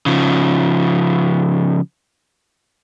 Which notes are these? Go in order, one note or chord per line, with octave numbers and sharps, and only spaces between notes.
C#3 F3